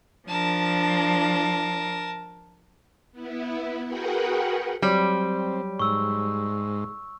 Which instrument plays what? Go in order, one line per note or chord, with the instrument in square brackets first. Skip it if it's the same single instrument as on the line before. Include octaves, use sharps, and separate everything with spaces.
[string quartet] F3 D4 [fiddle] A#4 A5
[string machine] B3 E4
F#4 G#4 A#4 B4 F#5 G5
[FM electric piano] F#3 C#5 D5 [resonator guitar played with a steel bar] G3 [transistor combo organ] C4
[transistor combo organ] G#2 [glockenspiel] C#6 E6